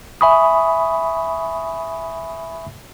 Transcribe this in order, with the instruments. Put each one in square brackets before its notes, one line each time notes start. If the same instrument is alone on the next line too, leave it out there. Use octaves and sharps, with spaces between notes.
[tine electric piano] E5 G#5 B5 C#6 D#6